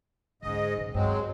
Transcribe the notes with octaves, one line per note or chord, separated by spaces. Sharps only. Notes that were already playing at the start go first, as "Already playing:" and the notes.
G#2 D3 C#4 D#5
A#2 D#3
G2 F#3 G#3 C4